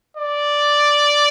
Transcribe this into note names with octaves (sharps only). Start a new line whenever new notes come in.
D5